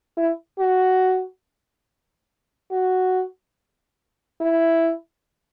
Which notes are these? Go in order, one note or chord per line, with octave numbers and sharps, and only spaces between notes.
E4
F#4
F#4
E4